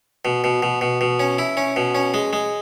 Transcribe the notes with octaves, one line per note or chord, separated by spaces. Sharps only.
B2
B2
B2
B2
B2
C#4
E4
C#4
B2
C#4
G#3
G#3